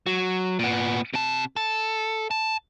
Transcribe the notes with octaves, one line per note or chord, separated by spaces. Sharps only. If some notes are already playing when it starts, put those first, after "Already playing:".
F#3
A#2 B3
C3 A5
A4
A5